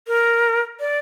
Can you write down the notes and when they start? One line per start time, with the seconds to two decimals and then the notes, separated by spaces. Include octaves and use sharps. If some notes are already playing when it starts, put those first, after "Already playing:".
0.08 A#4
0.80 D5